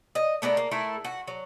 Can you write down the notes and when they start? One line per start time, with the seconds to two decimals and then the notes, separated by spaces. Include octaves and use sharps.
0.15 D#5
0.42 A3 B3 D4 A#4
0.57 A#3
0.71 A3 E4 A4 A#4
1.05 F#4
1.27 F#3